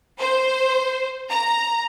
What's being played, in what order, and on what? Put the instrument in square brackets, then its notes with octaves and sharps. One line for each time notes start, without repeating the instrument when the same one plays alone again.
[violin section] C5
A#5